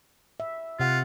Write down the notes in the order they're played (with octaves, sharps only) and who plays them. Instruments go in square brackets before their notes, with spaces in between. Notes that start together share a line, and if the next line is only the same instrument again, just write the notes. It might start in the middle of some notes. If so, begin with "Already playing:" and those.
[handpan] E5
[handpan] C3 F#5 [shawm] F4